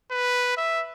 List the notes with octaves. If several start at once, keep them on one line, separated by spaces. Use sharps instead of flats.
B4
E5